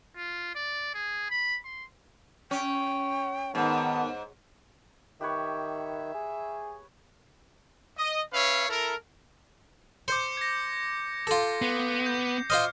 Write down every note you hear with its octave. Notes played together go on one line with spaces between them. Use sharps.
F4
D5
G#4
B5
C6
C#4 G5
G#2 D#3 B3 A5
D#3 G4 B4 C#5 E5
G#4
D#5
C#4 B4 C#5 E5 F5
E4 A4 A#4
C5 D6 G6 C#7
G#6 A#6
F4 A4
B3 C7
G6
F4 C5 D#5 F6